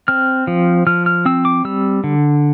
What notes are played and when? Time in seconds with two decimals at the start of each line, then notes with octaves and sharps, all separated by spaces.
0.08 C4 F6
0.47 F3
0.87 F3 F6
1.06 F6
1.25 C4 E6
1.45 D6
1.65 G3 E6
2.04 D3